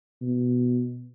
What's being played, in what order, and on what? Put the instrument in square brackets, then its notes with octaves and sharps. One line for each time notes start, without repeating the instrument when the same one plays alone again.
[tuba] B2